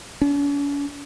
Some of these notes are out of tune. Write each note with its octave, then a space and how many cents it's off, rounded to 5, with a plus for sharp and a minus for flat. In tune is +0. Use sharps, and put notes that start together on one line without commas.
C#4 +45